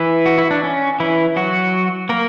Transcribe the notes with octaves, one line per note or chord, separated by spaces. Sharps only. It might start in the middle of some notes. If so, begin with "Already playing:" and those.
Already playing: E3 E4
F#4
E4
D4
C#4
E3 E4
F#3 F#4
A#3 A#4